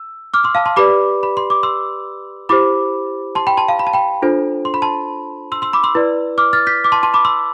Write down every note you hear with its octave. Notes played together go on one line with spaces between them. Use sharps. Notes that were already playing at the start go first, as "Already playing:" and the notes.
Already playing: E6
D6 F6
C6 E6
F5 A5
A5 C6
G4 B4 D5 B5 D6
B5
C6
D6
C6 E6
E4 G4 C5 B5 D6
A5 C6
G5 B5
A5 C6
F5 A5
B5
A5
G5 B5
D4 F4 A4 C5
C6
B5
A5 C6
C6 E6
C6 E6
B5 D6
C6 E6
E4 B4 D5
D6 F6
F6 A6
G6 B6
D6
A5 C6
A5 C6
B5 D6
C6 E6